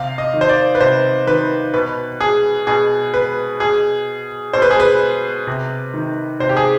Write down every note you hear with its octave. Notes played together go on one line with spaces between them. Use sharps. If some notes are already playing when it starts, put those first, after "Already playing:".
Already playing: C3 F5
D#5
D#3
C5
D5
B4
C3 C5
D#3 B4
B2 B4
G#4
B2 G#4
B4
B2 G#4
B2 C5
B4
G#4
B4
C3
D#3
C3 C5
G4
G#4